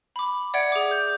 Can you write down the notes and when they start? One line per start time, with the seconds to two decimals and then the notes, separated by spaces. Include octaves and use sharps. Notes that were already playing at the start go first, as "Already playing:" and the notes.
0.16 B5 D6
0.54 D5 E5 F#5 G#6 C#7 D7
0.72 G#4 D6
0.91 G6